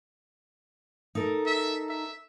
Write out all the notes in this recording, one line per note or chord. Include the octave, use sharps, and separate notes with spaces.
D#4 A4 A#4
E5
E5